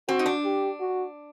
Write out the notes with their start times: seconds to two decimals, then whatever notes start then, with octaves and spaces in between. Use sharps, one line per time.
0.08 C4 F#4
0.19 D#4
0.26 D4
0.44 G4
0.80 F#4